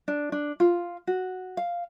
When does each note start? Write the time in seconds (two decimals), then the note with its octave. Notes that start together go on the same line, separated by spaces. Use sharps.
0.08 D4
0.32 D4
0.60 F4
1.07 F#4
1.57 F5